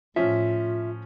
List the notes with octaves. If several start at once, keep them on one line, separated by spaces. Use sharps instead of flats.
A2 F3 C#4 F4 E5